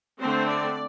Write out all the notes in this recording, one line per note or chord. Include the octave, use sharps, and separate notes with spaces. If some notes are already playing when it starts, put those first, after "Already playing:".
D3 A3 C4 C5
D5